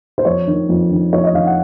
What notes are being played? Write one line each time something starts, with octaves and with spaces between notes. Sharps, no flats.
C5
F2 C#5
D#3
F2
D#3
F2 C#5
D#5
D#3 F5
F#5